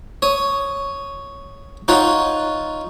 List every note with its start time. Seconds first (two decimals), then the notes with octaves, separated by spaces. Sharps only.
0.22 C#5 D#6
1.88 D#4 F4 C#5 F#5